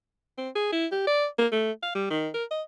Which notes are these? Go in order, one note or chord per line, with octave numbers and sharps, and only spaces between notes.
C4
G#4
E4
G4
D5
A#3
A3
F5
G3
D#3
A#4
D#5